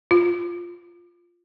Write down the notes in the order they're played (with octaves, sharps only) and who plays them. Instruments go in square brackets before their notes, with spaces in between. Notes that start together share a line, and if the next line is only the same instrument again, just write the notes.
[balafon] F4